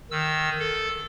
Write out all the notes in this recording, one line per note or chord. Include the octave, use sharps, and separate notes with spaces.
D#3 E6
A4